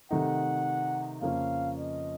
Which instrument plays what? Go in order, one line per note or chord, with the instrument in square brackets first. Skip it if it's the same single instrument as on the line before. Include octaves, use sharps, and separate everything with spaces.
[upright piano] C3 D#3 A3 D#4 [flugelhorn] F#5
[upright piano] F2 C#3 F3 A#3 C#4 [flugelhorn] F5
[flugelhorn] D#5